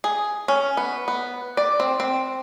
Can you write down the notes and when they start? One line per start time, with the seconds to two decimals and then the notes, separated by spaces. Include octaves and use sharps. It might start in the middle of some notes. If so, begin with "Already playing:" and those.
0.04 G#4
0.48 C#4
0.77 B3
1.08 B3
1.57 D5
1.80 C4
2.00 C4